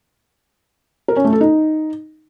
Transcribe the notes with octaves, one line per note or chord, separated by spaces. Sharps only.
A#4
C#4
A3
A4
D#4